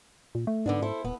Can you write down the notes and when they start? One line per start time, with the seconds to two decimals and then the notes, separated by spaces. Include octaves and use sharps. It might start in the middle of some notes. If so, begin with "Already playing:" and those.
0.35 A#2
0.47 A3
0.66 G#2 D3 B3 D4
0.82 E4 A4 C5
1.05 D#1 B3